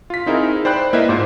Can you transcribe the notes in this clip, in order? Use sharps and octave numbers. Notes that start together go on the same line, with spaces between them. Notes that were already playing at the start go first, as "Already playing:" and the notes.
F4 B6
C4 D#4 E4 G#4 A#4
C5 D5 G5 B5 F#6
A#3 E4 B4 D#5 E5
G#2 F4 C5